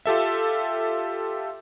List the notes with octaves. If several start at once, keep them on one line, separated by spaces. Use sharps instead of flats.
F4 G4 A4 E5